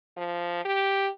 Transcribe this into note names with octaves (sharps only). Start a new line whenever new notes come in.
F3
G4